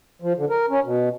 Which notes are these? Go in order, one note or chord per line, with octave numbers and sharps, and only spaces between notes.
F3
D3
A#4
C#4
B2